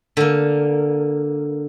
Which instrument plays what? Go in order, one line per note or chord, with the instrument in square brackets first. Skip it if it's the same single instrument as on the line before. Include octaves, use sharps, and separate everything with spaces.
[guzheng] D3 A#3